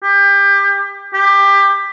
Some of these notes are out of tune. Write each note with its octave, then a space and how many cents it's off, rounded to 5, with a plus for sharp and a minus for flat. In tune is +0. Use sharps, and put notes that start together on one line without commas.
G4 +25
G4 +20